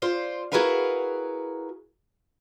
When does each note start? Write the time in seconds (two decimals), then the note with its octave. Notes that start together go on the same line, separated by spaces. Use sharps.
0.02 F4 C5 D5
0.52 E4 F#4 G#4 A#4 B4 F5